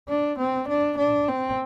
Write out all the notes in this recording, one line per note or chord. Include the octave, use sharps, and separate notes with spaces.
D4
C4
D4
D4
C4